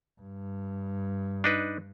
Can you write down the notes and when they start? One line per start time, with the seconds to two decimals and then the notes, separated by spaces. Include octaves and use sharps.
0.21 G2
1.44 D4 D#4 B4